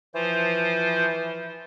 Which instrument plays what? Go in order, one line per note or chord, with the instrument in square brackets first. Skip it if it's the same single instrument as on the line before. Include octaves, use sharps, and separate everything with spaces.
[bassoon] E3 [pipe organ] F3 F4 C5